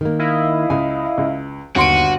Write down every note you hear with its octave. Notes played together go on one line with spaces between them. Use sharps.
D#3 A#3
E4 D#5 F5
C#2 G#5
C#2
G1 D#2 F#4 C6 D7 D#7